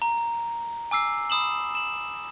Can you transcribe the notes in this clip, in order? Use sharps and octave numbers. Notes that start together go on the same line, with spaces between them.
A#5
G#5 D6 E6 C7
B5 D#6 E7 F#7
E7 F#7